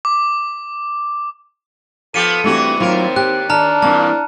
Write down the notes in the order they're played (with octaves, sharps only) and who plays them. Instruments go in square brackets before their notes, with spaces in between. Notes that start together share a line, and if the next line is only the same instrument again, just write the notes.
[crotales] D6
[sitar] F3 B3 G4 [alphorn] A4 [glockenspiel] C#7 D#7
[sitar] G2 E3 F#4 [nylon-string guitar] A3 C4 G4
[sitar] D#2 A#4 [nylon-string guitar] F#3 F4 [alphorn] C4
[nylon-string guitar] G4 [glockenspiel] F#6
[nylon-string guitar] D#3 [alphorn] D4 [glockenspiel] A5 A#5 F6
[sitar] G2 A#2 [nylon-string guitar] E3 A#3 C4 [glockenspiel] A5